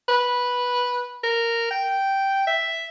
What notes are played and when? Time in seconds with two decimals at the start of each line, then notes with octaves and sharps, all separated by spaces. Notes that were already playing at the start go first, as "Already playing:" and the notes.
0.09 B4
1.23 A#4
1.70 G5
2.47 E5